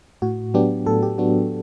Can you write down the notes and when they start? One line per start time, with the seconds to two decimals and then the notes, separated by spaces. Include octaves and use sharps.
0.22 A2 F#4
0.54 F#3 B3 D4 G4
0.86 A2 A4
1.03 G4
1.18 F#3 B3 D4 F#4